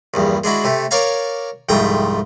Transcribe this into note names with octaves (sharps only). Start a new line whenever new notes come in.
A#1 E2 G2
G#3 D4 E4 F#4
C3 A3 A4
A#4 C#5 D5 F5 G#5 A#5
C2 F2 G#2 A3 G5 D#6